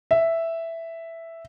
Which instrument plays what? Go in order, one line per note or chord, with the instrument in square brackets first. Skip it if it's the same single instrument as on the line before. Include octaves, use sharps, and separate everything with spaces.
[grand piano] E5